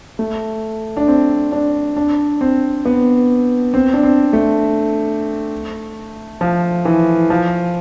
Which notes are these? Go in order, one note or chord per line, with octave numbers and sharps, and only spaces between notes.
A3
D4
C4
D4
D4
C4
B3
C4
D4
C4
A3
F3
E3
F3